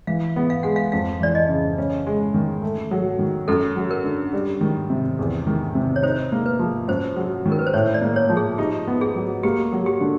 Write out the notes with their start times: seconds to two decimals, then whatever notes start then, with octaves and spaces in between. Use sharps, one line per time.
0.07 E3 F5
0.36 B3
0.50 F5
0.63 G#3 F#5
0.76 F5
0.92 F2 F5
1.21 E3 D5
1.35 D#5
1.49 C#3
1.78 C#4
2.07 G#3
2.34 D#3
2.62 A3
2.91 F#3
3.19 D#3
3.48 F#2 A4
3.76 F#3
3.91 A#4
4.04 D3
4.33 G3
4.61 D#3
4.90 C3
5.19 E2
5.47 D#3
5.75 C3
5.96 C#5
6.03 D#4 C5
6.32 A#3
6.46 B4
6.59 F3
6.88 F#2 C5
7.16 F#3
7.46 D#3
7.52 A#4
7.59 B4
7.67 C5
7.74 A2 C#5
7.94 D5
8.01 A#3
8.16 C#5
8.30 F3
8.37 G#4
8.58 D#4 G4
8.87 B3
9.01 G#4
9.16 F#3
9.43 A#3 G4
9.73 F#3
9.86 G4
10.01 D3